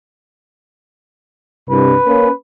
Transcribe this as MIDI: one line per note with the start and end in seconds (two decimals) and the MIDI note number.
1.70 1.95 36
1.70 1.95 43
1.70 2.32 71
2.05 2.28 58
2.05 2.28 61